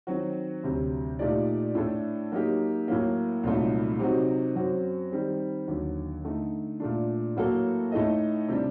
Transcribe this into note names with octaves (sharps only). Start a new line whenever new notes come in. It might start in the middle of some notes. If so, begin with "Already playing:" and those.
D#3 F#3 C4 F#4
D2 C3 F#3
A#2 A3 D#4 G4 D5
A2 A3 D4 A4
F#3 A#3 D#4 G4
A2 F#3 A#3
C2 A#2 F#3 A3 D#4
C3 F#3 C4 D#4 F#4
F#2 F#3 C4 F#4
D#3 G3 C4
D#2 D3 F#3
D3 A3 D#4
A#2 A3 D4
A2 F#3 A#3 F#4 A4
A2 A3 D#4 A4 D#5
C3 G3 D4